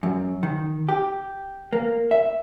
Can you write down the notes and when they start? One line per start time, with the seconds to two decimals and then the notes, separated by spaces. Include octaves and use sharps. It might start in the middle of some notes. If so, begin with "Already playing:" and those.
0.03 F#2
0.43 D#3
0.89 G4
1.73 A#3
2.11 E5